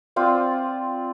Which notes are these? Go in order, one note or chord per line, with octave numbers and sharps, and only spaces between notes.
C4 F4 D5